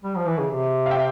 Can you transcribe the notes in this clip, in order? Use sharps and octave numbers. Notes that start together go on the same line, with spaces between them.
G3
F3
E3
C#3
C3
F5
E5 G5